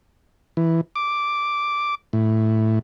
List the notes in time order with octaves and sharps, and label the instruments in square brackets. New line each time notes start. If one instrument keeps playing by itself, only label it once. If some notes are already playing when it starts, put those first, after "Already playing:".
[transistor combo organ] E3
D6
A2